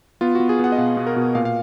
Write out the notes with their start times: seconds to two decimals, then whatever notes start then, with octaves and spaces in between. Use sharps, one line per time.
0.21 B3 F4
0.35 B3 F#4
0.49 G#4
0.59 B3 F#5
0.72 D#5
0.78 B2 F5
0.97 B2
1.07 A#4
1.16 B2
1.35 A#2 F5
1.45 F5